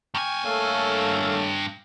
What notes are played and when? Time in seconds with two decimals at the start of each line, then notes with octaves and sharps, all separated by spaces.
0.15 G2 G5 G#5 C#6 F6
0.45 A3 A#3 A4 C#5 F5